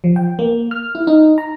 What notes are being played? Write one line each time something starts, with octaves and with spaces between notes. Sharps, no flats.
F3
G5
A#3
F6
E4
D#4
A#5